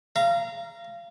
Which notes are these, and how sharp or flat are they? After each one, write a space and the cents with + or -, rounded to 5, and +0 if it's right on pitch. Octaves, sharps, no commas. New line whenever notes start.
F5 -25 A#5 +0